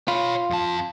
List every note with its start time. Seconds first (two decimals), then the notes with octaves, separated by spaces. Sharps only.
0.08 F4 C#5 B5
0.50 F2 A5